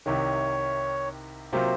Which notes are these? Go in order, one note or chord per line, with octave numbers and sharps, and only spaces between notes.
C2 C3 D#3 C#5
C3 F#3 A#3 F4 C5